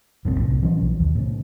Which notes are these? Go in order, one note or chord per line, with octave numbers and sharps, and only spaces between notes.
F1 A#1 B2 C4
C2 A2
E3 F#3 C#4
B1 F3
D#2
A2 C#3